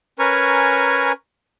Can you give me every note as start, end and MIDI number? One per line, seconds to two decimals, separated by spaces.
0.19 1.12 61
0.19 1.12 70
0.19 1.12 71
0.19 1.12 80
0.19 1.12 82
0.19 1.12 85